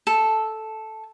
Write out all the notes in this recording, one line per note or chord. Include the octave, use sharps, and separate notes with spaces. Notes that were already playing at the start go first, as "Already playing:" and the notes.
A4